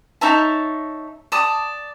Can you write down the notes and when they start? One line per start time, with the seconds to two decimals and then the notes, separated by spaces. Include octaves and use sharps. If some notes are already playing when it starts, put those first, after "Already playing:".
0.21 D#4 C#5 E5 A5
1.32 D5 A5 D#6